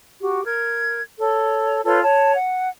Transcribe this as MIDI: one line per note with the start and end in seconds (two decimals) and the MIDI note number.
0.21 0.42 66
0.21 0.42 67
0.45 1.02 70
0.45 1.02 92
1.20 1.81 69
1.20 1.81 73
1.84 2.01 65
1.84 2.01 69
1.84 2.01 71
1.84 2.01 73
2.02 2.34 73
2.02 2.34 81
2.34 2.70 78